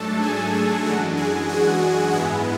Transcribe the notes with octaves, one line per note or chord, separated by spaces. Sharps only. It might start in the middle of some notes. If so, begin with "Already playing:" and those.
Already playing: G#2 F#3 A3 D4 A4 A5
G#4 G#5
G#4 G#5
F#2 E3 G#3 D4 F#4 F#5
G#4 G#5
F#4 F#5
G#2 G#3 B3 E4 G#4 G#5